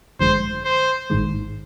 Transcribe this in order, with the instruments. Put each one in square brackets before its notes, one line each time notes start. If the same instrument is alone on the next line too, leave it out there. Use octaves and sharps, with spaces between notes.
[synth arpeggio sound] G#1 F#2 D3 F3 G#3 [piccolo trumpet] C5
[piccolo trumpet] C5
[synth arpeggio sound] A1 G#2 D#3 G#3